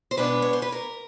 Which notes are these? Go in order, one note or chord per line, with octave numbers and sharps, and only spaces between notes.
C5
B2 G#3 B3 D4 B4
C#5
C5
B4
A#4